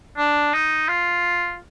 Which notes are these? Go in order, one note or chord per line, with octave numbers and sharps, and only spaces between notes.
D4
D#4
F4